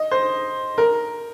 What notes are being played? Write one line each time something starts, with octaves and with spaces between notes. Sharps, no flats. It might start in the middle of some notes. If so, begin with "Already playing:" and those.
Already playing: D#5
C5
A#4